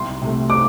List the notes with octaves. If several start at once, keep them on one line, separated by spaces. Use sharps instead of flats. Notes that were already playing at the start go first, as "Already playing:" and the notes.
Already playing: C2 C6
C3 A3
D6